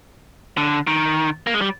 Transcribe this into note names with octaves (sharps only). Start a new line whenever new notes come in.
D3
D#3
A#3
G#3
G3